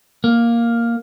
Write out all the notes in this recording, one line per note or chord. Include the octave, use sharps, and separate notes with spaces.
A#3